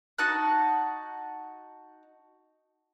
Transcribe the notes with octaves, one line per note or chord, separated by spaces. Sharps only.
D#4 F#4 A5 F#6